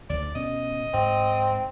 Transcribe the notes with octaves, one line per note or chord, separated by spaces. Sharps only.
D2 D5
B2 C#4 D#5
G#2 C4